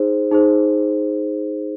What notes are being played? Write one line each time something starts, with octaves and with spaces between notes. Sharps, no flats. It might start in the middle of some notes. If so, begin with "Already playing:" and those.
Already playing: D#4 G#4 C5
D#4 G#4 C5